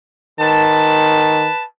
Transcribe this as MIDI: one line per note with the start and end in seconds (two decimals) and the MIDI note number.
0.40 1.48 51
0.40 1.63 71
0.40 1.63 81